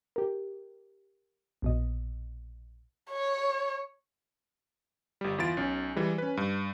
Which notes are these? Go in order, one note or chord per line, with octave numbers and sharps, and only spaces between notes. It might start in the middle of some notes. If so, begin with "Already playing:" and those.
G4 A#4
A#1 B2 D#5
C#5
G1 G3
E2 E4 F4 A6 D7
B1 C#4
E3 G3 G#3
C#4 B4
G2